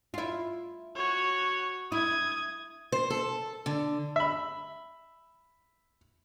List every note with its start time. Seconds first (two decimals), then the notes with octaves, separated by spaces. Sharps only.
0.14 E4 F4
0.96 F#4 C#5
1.92 E4 D#6 G#6
2.92 C5
3.10 A4
3.66 D3
4.16 E5 B5